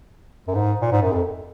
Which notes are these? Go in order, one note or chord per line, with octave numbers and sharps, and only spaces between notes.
F#2
G#2
A#2
G#2
F#2
F2